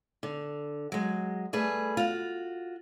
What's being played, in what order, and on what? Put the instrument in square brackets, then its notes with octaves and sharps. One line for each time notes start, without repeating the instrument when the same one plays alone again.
[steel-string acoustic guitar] D3
F#3 G#3
G3 A3 G#4 B4
F4 F#4